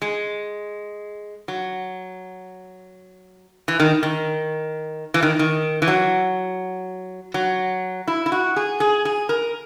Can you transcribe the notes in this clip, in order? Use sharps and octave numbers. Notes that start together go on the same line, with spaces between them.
G#3
F#3
E3
D#3
D#3
E3
D#3
D#3
E3
F#3
F#3
E4
E4
F#4
G#4
G#4
G#4
A#4